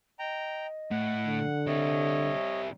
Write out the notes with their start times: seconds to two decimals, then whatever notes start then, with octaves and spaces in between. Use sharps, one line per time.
0.19 D#5 G5 A#5
0.91 A2 F#5
1.26 D3
1.67 G3 C4 C#5 D#5 E5